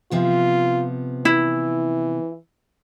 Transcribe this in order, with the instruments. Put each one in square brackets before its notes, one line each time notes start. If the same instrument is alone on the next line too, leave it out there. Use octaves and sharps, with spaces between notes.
[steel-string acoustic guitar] C3 F3 B3 [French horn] F4
[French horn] E3 [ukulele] E4